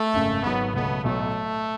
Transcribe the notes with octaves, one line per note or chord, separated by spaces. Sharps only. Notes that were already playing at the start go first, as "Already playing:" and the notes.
Already playing: A3
G#1 F#2 C#3
G#1 G#2 F#3 B3
C#2 B2 F#3 A3 B3
B1 A2 F#3 A3